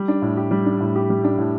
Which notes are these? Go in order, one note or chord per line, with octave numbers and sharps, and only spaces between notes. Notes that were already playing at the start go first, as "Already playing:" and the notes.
Already playing: G3
D4
A2
G4
G3
D4
A2
G4
G3
D4
A2